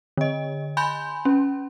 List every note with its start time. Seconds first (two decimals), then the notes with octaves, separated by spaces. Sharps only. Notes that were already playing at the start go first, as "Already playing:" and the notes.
0.17 D3 D#5
0.77 G#5 B5 C6 G6
1.25 C#4